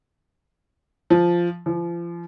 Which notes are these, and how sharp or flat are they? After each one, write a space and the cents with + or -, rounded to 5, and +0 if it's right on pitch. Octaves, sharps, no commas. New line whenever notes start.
F3 -10
F3 -35